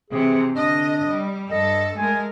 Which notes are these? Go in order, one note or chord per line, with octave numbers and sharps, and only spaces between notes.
C3 E3 G#4
D3 D4 D#5
G3
G2 A4 D#5
G#3 A3 A#4 G#5